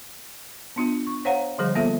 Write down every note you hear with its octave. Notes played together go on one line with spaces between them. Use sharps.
B3 D4 F4
C#6
C5 C#5 F5 F#5 A#5
D3 F3 G3 G#4 C5
G3 A#3 B3 F4 A4 E5